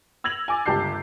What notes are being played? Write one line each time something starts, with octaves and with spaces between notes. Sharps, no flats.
E6 G#6 A#6 F7 F#7
G#5 D6 A6
G1 C#2 G4 A5 G6 C7